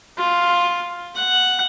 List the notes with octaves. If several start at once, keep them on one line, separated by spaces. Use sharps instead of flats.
F4
F#5